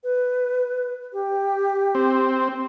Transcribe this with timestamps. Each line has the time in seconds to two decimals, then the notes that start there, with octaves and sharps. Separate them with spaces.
0.03 B4
1.13 G4
1.95 C4